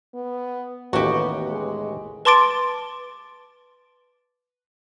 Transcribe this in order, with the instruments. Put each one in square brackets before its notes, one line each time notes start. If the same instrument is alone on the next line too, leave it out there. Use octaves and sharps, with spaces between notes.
[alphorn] B3
[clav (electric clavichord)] A1 D#2 [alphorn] B3 [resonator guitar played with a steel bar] F#4 G4
[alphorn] G#3
[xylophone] B4 A5 C6 D6 A6 D7